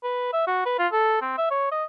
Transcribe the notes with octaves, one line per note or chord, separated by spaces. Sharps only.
B4
E5
F#4
B4
F4
A4
C4
E5
C#5
D#5